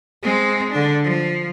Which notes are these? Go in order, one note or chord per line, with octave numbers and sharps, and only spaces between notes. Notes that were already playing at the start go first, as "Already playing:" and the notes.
G#3 C4
D3 D4
F3